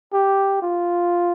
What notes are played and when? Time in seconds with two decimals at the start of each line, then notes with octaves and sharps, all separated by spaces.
0.13 G4
0.62 F4